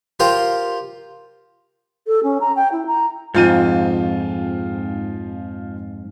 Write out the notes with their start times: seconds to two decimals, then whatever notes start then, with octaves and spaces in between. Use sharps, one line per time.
0.20 F4 G4 A#4 C5
2.07 A4
2.23 C#4
2.41 A#5
2.56 G5
2.72 E4
2.86 A#5
3.35 F2 G#2 F3 F4 D#7